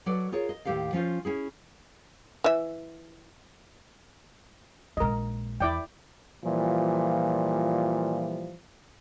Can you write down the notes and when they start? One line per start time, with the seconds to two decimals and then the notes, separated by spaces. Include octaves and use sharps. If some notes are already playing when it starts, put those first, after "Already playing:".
0.06 F#3 A4 B4 D5
0.32 F4 G#4 A#4 C#5
0.49 D#5
0.65 D#2 A2 A3 G4 A4 F5
0.93 F3 C#4 F4 C5
1.25 C#4 E4 G#4
2.44 E3 E5
4.97 A#1 G#3 A#4 D#5
5.60 E2 E4 D5 G5
6.44 A#2 E3 F3 G3